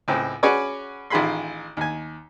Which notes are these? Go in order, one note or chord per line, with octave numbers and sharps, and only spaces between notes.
C#2 A2 C4
C#4 F#4 G#4 B4 C#5 D5
A1 D#3 F4 G#4 B5 C6
D#2 G#5